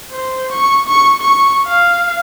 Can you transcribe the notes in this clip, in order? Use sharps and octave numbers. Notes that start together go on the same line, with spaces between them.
C5
C#6
C#6
C#6
F5